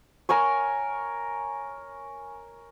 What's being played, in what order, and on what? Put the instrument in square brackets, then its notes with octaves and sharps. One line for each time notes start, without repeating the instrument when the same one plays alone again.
[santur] A#4 C#5 G#5 C#6